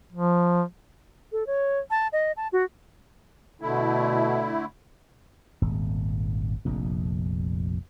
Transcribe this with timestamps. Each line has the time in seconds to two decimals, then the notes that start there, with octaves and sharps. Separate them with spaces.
0.13 F3
1.32 A4
1.47 C#5
1.90 A5
2.13 D#5
2.37 A5
2.52 F#4
3.61 B2 D3 A3 E4
5.62 D#1 G#1
6.65 F1 A#1 F2